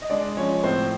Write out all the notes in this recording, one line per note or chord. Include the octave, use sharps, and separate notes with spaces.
D#5
G#3 D4 D5
F3 C#4 C#5
A2 C4 C5